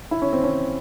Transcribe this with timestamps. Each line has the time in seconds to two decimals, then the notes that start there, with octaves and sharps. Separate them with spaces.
0.11 E4
0.22 C#4
0.33 C4
0.44 C#4